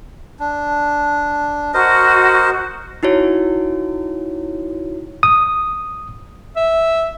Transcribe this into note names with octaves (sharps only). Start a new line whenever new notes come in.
D4
F#4 A#4 C5 D#5
D#4 E4 F#4 C#5
D#6
E5